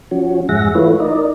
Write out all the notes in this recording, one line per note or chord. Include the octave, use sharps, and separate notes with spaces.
F3 C#4 F#4
F2 G#2 G#4 E5 F#5 A#6
E3 A3 E4 F4 B4 C#5
D#4 A#4 D5 D#5